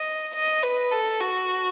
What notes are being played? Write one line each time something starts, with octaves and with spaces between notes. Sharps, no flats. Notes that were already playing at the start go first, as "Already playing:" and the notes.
Already playing: D#5
D#5
B4
A4
F#4